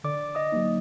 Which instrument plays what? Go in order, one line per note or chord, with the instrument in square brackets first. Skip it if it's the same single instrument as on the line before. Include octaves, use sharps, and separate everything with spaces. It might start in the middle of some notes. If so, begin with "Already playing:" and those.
[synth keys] D3 [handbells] D5 D6
[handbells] D#5 D#6
[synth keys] F#3 A#3 D#4